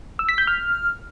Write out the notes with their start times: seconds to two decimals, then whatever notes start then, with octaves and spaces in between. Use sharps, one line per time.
0.19 E6
0.29 B6
0.38 G6
0.47 F6